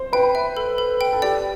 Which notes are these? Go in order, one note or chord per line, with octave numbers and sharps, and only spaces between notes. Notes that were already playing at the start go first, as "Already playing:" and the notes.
Already playing: C5 C6
B4 G5
E5
A4
A4
G5
A4
G4 D5